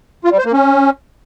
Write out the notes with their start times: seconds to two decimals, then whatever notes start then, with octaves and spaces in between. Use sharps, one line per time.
0.24 F4
0.31 G3
0.39 C5
0.46 A#3
0.53 C#4